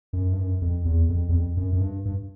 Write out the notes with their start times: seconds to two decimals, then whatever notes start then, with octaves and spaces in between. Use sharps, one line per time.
0.13 F#2
0.32 G2
0.38 F#2
0.62 F2
0.85 E2
1.09 F2
1.29 E2
1.33 F2
1.57 F#2
1.72 F#2
1.80 G2
2.05 G2